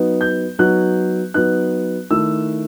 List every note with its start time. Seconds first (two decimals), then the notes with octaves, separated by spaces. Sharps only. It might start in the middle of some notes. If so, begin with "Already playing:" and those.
Already playing: F#3 B3 D#4
0.21 G6
0.59 F#3 B3 D#4 F#6
1.34 F#3 B3 D#4 F#6
2.10 D#3 A3 E4 E6